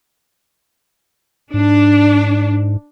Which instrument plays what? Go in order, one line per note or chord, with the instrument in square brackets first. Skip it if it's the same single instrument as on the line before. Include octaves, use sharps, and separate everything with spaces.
[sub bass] G#2 [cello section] D4